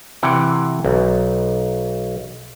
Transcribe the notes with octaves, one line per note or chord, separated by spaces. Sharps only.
C3 E3 F#5 G5
B1